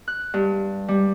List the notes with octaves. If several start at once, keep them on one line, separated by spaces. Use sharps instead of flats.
F#6
G2
G3